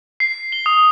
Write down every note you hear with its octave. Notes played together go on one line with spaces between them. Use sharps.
C7
G7
D#6